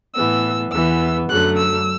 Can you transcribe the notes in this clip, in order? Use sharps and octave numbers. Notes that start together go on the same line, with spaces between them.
A2 E3 B3 E6
E2 E3 B3 E6
F#2 D3 F#3 A3 F#6
E6